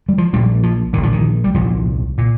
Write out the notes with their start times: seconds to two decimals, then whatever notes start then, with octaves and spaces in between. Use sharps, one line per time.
0.09 G3
0.18 F3
0.33 A#1 A#2 G3
0.63 F3
0.93 A#1 A#2 D#3
1.03 F3
1.13 D#3
1.44 G3
1.54 C2 A#2 F3
2.18 A#2